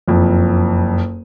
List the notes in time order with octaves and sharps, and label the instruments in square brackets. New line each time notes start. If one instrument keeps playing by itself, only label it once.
[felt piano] F#1 F2